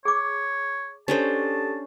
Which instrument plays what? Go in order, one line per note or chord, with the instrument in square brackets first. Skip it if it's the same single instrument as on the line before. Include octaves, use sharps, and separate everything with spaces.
[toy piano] G#4 D6 [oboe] C#5
[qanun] C#4 D4 C5 [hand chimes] G4 A4 [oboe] A5